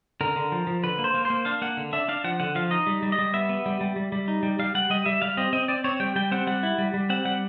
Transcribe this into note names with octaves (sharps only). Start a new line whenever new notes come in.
D3 A#4
D3
F3
F3
D3 B4
A#3
C5
A#3
A#3 C5
D4 F5
A#3 F#5
D3
D4 E5
D4 F5
F3 F#5
D3 F#5
F3 F5
D#4 D#5
G3
G3
D#5
G3
B3 E5
B3
G3
G3
G3
G3
D#4
G3
G3 F5
G3 F#5
G3 D#5
G3 E5
G3 F5
C4 D#5
C4 D#5
C4 D5
C4 C#5
G3 G5
G3 G5
C4 F#5
G3 F#5
E4
G3
G3
C4 F#5
G3 F#5